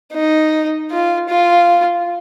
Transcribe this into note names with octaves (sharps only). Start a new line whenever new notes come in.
D#4
F4
F4